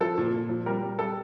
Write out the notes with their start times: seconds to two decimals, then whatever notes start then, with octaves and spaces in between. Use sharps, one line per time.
0.01 F3 A4
0.18 A#2
0.34 A#2
0.49 F3
0.66 G3 A#4
0.82 G3
0.98 G3 A4